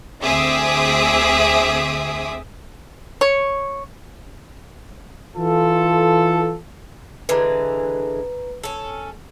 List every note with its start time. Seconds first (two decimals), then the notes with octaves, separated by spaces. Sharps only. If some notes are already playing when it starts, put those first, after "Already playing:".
0.23 D2 C4 G#4 E5 D6 D#6
3.21 C#5
5.37 E3 F4 A4
7.29 D3 E3 G#3 B4 A#5
8.63 C#4 A4